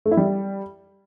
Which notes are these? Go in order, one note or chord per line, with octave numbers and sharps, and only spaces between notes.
A3
E4
G3